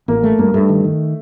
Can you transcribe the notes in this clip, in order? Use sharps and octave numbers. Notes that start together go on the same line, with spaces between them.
A1 A#3
A3
G2 A#3
G2 A3
D#3
D#3